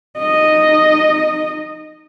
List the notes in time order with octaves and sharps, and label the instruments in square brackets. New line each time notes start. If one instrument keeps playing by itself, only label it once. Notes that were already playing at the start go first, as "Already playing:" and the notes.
[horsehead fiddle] D#4 D#5